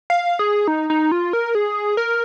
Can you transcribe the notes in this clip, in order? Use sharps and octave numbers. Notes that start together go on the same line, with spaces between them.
F5
G#4
D#4
D#4
F4
A#4
G#4
A#4